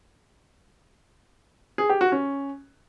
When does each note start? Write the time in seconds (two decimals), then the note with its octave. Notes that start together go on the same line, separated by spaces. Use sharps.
1.78 G#4
1.90 G4
2.01 F#4
2.12 C#4